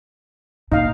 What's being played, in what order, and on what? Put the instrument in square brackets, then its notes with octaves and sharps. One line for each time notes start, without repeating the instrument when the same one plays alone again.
[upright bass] A#2 [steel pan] D#4 F5